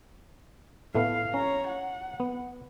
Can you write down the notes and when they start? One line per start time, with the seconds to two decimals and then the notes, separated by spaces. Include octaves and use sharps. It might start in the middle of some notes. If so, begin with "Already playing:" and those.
0.95 A2 A3 B3 F5
1.34 C#4 C#5 A#5
1.68 F#5
2.20 B3